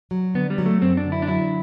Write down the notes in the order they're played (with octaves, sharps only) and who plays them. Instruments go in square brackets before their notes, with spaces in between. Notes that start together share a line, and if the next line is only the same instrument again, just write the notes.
[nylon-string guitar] F#3
[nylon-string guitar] D3 [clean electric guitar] B3
[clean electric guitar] G3
[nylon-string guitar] F#3
[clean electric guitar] A3
[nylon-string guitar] F#2 [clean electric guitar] C4
[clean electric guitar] D4
[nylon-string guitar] D3
[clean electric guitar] E4
D4
[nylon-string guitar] F#3 [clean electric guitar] E4